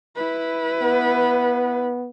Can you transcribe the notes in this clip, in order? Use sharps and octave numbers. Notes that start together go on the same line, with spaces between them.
E4 B4
B3